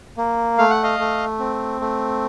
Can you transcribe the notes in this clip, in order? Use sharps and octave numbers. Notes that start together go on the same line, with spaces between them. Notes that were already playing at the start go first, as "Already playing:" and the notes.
A#3
A3 F5
F#5
D#5 F5
A3
C4
A3